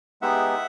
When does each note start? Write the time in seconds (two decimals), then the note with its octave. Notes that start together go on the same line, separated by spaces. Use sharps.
0.22 G#3 B3 D#4 G4 E5 F#5